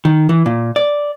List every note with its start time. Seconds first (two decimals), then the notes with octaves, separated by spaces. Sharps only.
0.05 D#3
0.29 E3
0.46 A#2
0.76 D5